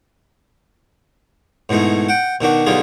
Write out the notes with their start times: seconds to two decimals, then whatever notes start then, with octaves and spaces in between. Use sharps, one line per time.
1.69 G#2 B2 E3 G#3 A3
2.09 F#5 G5
2.41 B2 D#3 D4 F#4
2.66 B1 B2 D3 G3 F4 G#4